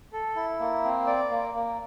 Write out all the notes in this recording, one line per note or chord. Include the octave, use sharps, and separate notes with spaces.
A4
E4
A#3
C4
D5
A#3
A#3